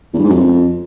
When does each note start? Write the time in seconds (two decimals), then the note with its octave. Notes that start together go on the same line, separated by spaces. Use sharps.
0.14 E2
0.19 G2
0.24 G#2
0.29 F#2
0.35 F2